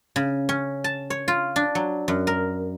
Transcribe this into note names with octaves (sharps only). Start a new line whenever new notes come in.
C#3
C#4
A5
C#5
F4
D4
F#3
F#2
A#4